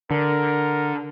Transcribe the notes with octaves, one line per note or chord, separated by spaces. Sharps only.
D3 A#4